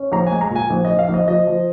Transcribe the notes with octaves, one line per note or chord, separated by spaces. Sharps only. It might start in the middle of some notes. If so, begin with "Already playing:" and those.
Already playing: C#4
A#1 A#5
G#3 G#5
A#5
A#2
G#5
A#1
A#1 D#5
F5
A#1
D#5
F3 D#5
F3